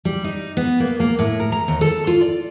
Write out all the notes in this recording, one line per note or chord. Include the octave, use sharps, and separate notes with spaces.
G3
D#4
B3
A#3
A#3
A2
A#4
A#5
D#2
A4
F4
D5